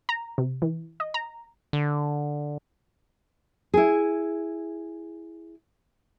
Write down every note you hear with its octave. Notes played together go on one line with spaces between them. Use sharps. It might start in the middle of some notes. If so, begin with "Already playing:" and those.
A#5
C3
E3
D#5
A#5
D3
E4 G#4